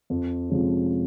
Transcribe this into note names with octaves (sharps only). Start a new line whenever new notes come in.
F2
C3 F3 G#3 C#4